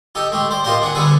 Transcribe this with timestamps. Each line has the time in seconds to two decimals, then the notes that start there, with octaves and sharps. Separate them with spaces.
0.15 D#4 G4 A4
0.32 G#3 A3 G4
0.51 C5 D5
0.64 A#3 D#4 F4 G4 A#4 C5
0.82 D4 G#4 F#5
0.95 D3 G3 B3 G#4 A4 B4